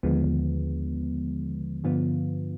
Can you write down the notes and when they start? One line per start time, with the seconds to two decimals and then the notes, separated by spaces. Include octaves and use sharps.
0.03 D#2 D3 F3 G#3 B3
1.84 G2 D3 F3 B3 F4